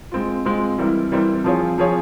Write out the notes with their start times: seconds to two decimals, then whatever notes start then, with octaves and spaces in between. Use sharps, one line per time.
0.12 G#3 C4 F4
0.45 G#3 C4 F4
0.78 E3 G3 C4 E4 A#4
1.11 E3 G3 C4 E4 A#4
1.44 F3 C4 F4 G#4 C#5
1.78 F3 C4 F4 G#4 C#5